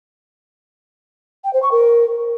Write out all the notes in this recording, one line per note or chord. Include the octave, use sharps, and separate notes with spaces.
G5
C5
C#6
A#4